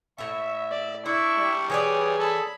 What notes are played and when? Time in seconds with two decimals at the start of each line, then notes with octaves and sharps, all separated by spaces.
0.18 A2 E4 E5 C#6
0.71 D5
1.06 D4 E4 C#6
1.37 G3
1.70 E3 G#4 B4 C#5 D5
2.19 A4 B5